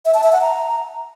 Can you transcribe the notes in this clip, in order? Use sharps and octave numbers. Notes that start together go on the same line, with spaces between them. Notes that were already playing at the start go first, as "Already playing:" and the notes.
E5
A5
E5
F#5
A#5